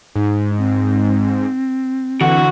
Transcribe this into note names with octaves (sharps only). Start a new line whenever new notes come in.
G#2 D#4
C4
D3 E3 F#4 F#5